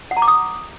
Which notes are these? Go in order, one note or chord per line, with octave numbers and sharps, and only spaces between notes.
F#5
A#5
D6
D#6